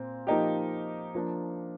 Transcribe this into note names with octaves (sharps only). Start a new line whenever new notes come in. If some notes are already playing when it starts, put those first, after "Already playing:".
Already playing: A#2 C4
F3 A#3 D#4 G4
F3 A#3 D4